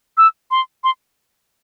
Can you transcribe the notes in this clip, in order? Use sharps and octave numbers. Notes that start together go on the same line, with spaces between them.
E6
C6
C6